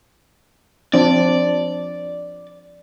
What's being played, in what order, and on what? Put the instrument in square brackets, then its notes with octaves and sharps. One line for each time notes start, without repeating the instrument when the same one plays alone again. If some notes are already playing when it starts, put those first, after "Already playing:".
[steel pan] F3 C4 D4 [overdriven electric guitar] D5